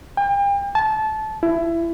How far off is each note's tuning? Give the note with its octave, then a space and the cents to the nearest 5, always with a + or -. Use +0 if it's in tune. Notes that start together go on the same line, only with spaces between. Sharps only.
G5 +40
A5 -20
E4 +20